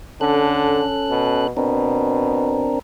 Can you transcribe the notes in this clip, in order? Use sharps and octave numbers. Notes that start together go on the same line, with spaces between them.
D3 C#4 A4 F#6
B2
B2 C4 D4 A#4